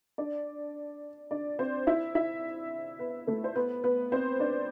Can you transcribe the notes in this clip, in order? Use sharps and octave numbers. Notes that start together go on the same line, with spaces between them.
D4 D5
D4 D5
C4 C5
E4 E5
E4 E5
B3 B4
A3 A4
C5
B3 B4
B3 B4
C4 C5
D4 D5